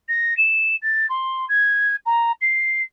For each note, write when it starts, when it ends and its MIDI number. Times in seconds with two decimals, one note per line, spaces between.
0.08 0.36 94
0.37 0.75 100
0.82 1.06 93
1.09 1.45 84
1.49 1.95 92
2.06 2.32 82
2.41 2.82 96